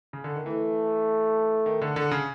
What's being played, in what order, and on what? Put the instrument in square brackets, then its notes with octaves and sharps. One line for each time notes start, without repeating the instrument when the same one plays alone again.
[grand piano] C#3
D3
D#3
[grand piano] E3 [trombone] A3
[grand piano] D#3
D3
D3
C#3